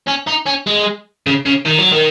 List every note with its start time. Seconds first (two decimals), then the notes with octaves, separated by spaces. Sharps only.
0.07 C#4
0.27 D#4
0.46 C#4
0.67 G#3
1.27 C#3
1.46 C#3
1.66 D#3
1.79 F#3
1.92 D#3